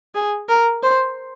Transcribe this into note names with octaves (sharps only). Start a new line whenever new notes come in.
G#4
A#4
C5